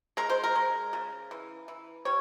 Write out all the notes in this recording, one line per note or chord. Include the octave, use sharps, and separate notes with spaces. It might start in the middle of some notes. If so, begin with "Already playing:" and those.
G#3 A#4
C5
A#4
G#3
C#3
E3
E3
G3 C#5